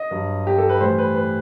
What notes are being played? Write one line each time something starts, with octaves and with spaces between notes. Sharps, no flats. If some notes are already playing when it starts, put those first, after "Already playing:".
Already playing: D#5
G2 F#3
G4
A4
B4
A2 E3 G3 C5
B4
B4